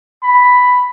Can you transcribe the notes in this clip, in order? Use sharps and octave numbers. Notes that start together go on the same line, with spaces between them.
B5